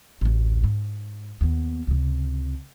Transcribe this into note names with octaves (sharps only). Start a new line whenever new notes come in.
A1 D2
G#2
D#2 B3
C#2 C3